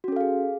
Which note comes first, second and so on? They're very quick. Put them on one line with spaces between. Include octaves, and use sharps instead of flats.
F#4 C#4 A4 F5 G#4